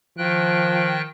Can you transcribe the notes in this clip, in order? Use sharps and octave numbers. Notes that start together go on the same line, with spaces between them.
D#3 F3 G5 F#6